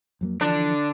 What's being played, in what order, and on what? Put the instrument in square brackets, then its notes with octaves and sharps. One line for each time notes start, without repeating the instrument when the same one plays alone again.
[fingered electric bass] F2 F#3 A#3
[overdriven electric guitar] D3 [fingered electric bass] E3 F3 [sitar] D4